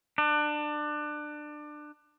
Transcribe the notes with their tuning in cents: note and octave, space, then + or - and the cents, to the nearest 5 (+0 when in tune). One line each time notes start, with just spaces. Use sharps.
D4 +25